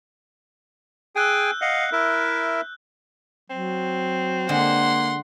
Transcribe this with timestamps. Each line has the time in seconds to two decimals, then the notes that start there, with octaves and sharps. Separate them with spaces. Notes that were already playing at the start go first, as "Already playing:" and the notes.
1.16 G#4 G5 G#5 E6 F#6 G6
1.61 D#5 F5 F#5
1.92 E4 A#4 E5
3.50 F#3 C4
4.49 D3 G#3 A#3 F#5 C6